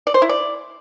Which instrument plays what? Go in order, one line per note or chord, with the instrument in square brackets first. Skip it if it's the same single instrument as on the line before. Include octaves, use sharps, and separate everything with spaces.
[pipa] D5
C5
E4
D5